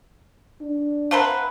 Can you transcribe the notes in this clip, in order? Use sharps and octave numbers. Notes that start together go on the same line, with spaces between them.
D4
C4 E4 B4 C5 F5 F#5 A5 A#5